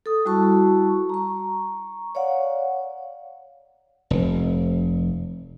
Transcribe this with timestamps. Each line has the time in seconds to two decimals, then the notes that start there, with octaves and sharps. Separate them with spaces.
0.06 A4 D#6
0.25 G3 E4 F#4 A5 C#6
1.10 A#5 C#6
2.15 C#5 D5 F5 F#5
4.10 F1